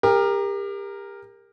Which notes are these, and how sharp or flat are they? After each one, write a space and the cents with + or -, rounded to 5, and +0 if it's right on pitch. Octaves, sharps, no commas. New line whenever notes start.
G4 +35 A#4 +0